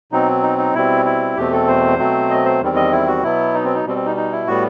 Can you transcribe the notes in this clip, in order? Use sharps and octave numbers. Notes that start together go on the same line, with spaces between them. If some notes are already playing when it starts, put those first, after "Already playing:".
B2 F#3 C4 D#4
D#4
D#4
B2 G3 C4 E4
E4
E2 B2 A3 C4 G4
A4
C5
B2 F#3 A3 C4
D#5
C5
E2 D#3 G3 C4
D#5
E4
F#4
B2 F#3 B3 E4
D#4
C4
D#4
B2 G3 C4
C4
D#4
D#4
E4
A2 G3 B3 F#4